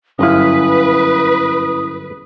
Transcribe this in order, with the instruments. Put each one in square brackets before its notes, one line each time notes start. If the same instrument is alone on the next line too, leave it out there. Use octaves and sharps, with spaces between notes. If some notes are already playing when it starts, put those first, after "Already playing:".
[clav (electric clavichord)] G1 F#2 F5 [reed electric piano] C#4 E4 [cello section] B4 [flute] D#6